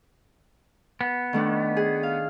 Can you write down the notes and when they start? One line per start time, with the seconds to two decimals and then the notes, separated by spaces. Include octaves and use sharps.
1.01 B3
1.33 D#3 A3 D4
1.77 G#4
2.03 F5